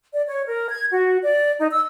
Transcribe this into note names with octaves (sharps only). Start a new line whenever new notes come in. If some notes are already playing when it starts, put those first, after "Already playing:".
D5
C#5
A#4
G#6
F#4
D5
D#4
E6